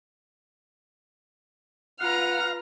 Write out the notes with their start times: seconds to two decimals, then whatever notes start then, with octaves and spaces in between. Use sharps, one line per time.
2.00 F4 B4 F5 F#5 A#5 F6